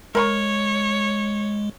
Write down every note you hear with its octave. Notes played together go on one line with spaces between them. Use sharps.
G#3 A#4 C#5 B5 C#6